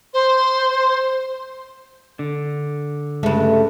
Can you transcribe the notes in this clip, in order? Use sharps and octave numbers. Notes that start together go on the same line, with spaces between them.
C5
D3
G2 C#3 G#3 A3